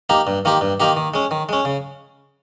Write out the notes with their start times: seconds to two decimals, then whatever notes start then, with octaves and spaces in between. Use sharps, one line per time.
0.09 A#3 D#4 G4
0.27 G2
0.45 D#3 A#3 D#4 G4
0.61 G2
0.80 D#3 A#3 D#4 G4
0.97 D#3
1.14 G#3 C#4
1.31 D#3
1.49 G#3 C#4
1.65 C#3